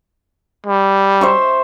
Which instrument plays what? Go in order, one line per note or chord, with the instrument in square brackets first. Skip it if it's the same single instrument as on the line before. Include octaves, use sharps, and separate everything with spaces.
[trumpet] G3
[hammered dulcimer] C5 E5 C#6